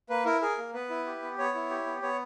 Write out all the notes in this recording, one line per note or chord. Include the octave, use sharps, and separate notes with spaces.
A#3 B4
E4 A#4
G#4 A#4
A#3
B3 B4
E4
G4
B3
B3 C#5
E4
G4
B3
B3 C#5